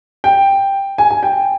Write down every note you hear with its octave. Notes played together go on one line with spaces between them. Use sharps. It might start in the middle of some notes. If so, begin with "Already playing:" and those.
G5
G#5
G#5
G5